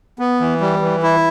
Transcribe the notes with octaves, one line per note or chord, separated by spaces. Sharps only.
B3
E3
G3
E3
E4